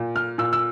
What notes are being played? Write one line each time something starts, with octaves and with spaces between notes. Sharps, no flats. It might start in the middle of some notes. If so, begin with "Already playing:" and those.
Already playing: A#2
F6
A#2 E6
E6